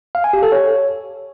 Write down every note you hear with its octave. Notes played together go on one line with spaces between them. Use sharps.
F5
G#5
G4
A4
C#5